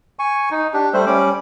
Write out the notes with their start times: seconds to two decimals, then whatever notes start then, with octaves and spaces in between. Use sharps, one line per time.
0.19 G#5 C#6
0.51 D#4
0.74 D4 G4
0.94 G3 A3 C5
1.06 G3 C#4 D6